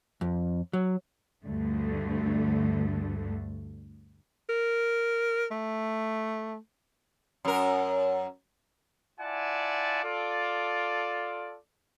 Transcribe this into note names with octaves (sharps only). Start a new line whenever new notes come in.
F2
F#3
D2 G2 D3 A3
A#4
A3
F#2 A#4
E4 F4 D5 F#5 G#5 A5
F4 A4 D5